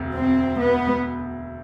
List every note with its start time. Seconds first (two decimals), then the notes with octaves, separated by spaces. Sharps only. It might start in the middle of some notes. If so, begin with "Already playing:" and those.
Already playing: E1 D2 C3
0.14 C4
0.60 B3